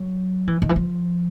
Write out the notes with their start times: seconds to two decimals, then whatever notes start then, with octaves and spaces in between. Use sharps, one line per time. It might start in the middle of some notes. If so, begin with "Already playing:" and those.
Already playing: F#3
0.47 E3
0.62 D#3
0.69 E3
0.76 F3